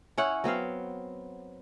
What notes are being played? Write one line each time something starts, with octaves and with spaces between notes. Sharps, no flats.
C#4 E4 C#5 F#5
F#3 B3 C4 F5